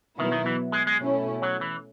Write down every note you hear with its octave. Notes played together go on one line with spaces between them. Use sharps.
B2 D#3 F#3 B3 E4
D#3
E3
G#3
G#3
B2 A3 C#4 E4
F#3
E3